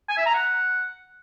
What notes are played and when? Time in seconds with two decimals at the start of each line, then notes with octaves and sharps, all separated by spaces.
0.09 G#5
0.17 E5
0.26 A#5
0.35 F#5